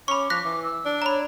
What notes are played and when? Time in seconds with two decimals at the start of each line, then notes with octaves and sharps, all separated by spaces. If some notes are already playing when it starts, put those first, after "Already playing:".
0.08 C#4 B5 C#6 D6
0.30 F3 F#6 A#6 B6
0.44 E3
0.63 E6
0.86 D4
1.02 C#5 A#5 B5